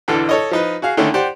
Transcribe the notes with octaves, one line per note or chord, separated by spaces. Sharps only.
E2 B2 D3 A4
A4 C#5 D#5
F3 D#4 B4
F#4 G#4 F5
D3 D#3 A3 C#4
G4 C5 D5 F#5